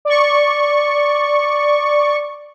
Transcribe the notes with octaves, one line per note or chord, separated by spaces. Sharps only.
D5 C#6